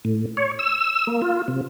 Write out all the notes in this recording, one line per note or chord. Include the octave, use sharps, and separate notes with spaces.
A2
C#5
E6
A#3
F4
C3